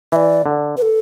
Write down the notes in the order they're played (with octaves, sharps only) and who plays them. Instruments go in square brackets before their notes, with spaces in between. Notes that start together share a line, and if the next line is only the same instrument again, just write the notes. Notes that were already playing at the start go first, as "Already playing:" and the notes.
[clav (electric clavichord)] E3 [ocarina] E5
[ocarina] D5
[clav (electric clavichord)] D3
[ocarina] B4
A4